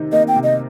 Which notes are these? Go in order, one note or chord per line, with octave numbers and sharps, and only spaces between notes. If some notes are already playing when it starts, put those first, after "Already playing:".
Already playing: C3 D#3 D#4
A#3 D#5
G5
C3
D#5